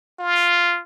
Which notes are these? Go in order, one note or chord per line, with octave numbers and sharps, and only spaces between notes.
F4